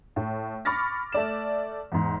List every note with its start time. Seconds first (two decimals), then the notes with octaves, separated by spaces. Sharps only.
0.16 A2
0.65 B5 C#6 D6 F6 A6 A#6
1.12 A3 D5 E7
1.92 E2 G#2